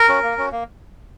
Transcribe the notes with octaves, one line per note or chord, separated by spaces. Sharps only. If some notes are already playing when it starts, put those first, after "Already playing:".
Already playing: A#4
C#4 F#4
A#3
C#4 F#4
A#3